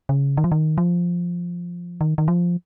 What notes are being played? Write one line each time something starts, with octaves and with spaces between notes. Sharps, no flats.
C#3
D#3
F3
D#3
F3
D#3
D#3
F3